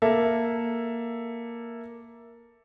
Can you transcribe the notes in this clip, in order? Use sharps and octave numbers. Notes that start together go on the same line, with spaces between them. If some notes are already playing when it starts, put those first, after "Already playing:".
A#3 A4 E5